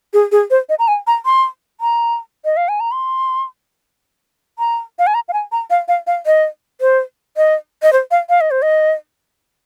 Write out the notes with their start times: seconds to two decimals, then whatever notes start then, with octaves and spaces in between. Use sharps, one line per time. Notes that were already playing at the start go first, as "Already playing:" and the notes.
0.13 G#4
0.32 G#4
0.51 C5
0.69 D#5
0.79 A#5
0.88 G#5
1.07 A#5
1.25 C6
1.81 A#5
2.45 D#5
2.57 F5
2.68 G#5
2.80 A#5
2.92 C6
4.59 A#5
4.99 F5
5.07 G#5
5.14 A#5
5.28 F5
5.33 G#5
5.52 A#5
5.70 F5
5.88 F5
6.07 F5
6.26 D#5
6.81 C5
7.37 D#5
7.83 D#5
7.93 C5
8.11 F5
8.29 F5
8.41 D#5
8.51 C5
8.62 D#5